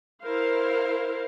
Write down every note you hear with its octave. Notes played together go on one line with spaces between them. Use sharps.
E4 A#4 C5 F5